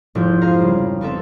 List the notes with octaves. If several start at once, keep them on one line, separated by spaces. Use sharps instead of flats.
F1 G#2 F3 E4 G6
G#4 C5 F5 A#5 C6
C#3 G3
B3 C4 A4 E5 A#5